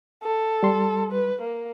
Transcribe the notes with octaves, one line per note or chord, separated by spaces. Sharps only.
A4
G3 C6
B4
A#3